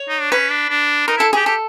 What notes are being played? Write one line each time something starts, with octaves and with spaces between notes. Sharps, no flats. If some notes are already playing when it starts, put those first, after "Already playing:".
Already playing: C#5
D#4
D4
C#4 B4
D4
D4
D#4 A#4
E4 A4
G4 G#4
G4 A4